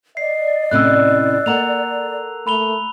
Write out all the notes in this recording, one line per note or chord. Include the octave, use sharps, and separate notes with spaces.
D5 D#5 C7
A2 C3 C#4 E6 F#6
A#3 A4 F#5 A#5 F7
A3 B5 F7 G7